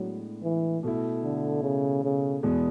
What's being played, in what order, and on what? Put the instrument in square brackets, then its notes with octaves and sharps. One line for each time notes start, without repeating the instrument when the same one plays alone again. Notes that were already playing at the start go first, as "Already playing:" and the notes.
Already playing: [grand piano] A2 G#3 B3 D4 [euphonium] F#3
[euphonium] E3
[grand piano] B2 A3 E4
[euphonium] D3
C#3
C#3
[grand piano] E2 B2 G#3 B3